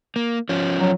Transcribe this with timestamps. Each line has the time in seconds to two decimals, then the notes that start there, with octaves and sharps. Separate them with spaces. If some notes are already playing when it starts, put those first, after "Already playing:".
0.16 A#3
0.49 F3 C#4
0.79 F#3